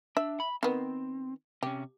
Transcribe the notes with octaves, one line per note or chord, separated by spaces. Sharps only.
D4 E5
B5
D#3 B3 C4
C3 C#4 G4